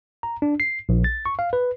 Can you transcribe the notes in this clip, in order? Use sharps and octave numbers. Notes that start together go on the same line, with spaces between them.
A#5
D4
C7
A#1
A6
C#6
F5
B4